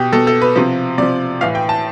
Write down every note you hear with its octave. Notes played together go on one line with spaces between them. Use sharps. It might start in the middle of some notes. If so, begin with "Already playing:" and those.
Already playing: B2 G4
B2 A4
A4
B4
C3 F3
C3 F3 D5
A2 E3 F5
G5
A5